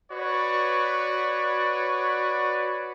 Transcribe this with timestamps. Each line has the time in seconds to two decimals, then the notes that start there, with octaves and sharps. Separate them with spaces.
0.12 F#4 B4 C#5 D5